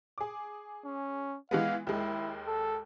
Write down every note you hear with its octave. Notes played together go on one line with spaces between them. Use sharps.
G#4 D6
C#4
E3 G#3 B3 F5
D#2 G#3 E4
A4